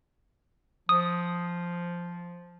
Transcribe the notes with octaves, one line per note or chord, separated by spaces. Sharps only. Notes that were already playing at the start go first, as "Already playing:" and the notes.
F3 D#6